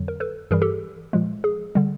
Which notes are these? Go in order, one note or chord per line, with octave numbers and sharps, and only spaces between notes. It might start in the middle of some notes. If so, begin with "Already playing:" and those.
Already playing: F2 D3 F#3
A#4
A4 B4
G2 E3 G3 G#4 A#4
G4 A4
A#2 F3 G#3
G#4
D3 G3